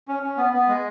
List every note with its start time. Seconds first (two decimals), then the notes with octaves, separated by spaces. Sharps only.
0.08 C#4
0.23 C#4
0.37 B3
0.53 B3
0.68 G#3